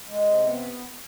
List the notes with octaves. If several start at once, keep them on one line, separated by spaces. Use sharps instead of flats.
G#3
C3
B3